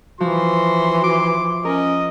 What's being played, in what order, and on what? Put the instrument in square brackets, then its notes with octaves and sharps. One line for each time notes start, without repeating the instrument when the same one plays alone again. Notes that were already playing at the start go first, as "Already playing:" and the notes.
[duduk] E3 [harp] F3 [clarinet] F#4 [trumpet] C6
[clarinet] D6
[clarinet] C#4 [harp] A#4 [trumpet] D#5